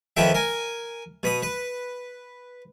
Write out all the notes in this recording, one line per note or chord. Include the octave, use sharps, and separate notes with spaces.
F2 D#3 F3 B4 E5 G5
A#4 G#5
B2 B5 D#6
B4